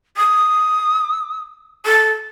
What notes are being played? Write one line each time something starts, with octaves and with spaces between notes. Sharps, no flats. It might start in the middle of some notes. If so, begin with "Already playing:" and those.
D#6
A4